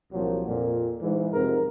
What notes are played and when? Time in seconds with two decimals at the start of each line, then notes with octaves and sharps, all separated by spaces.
0.13 C2 A#2 F3 F#3
0.48 F2 A#2
1.02 G#2 E3
1.33 F2 G#2 C3 A#4